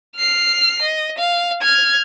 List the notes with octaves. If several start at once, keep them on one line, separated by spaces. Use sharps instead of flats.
F6 C7
D#5
F5
F6 G#6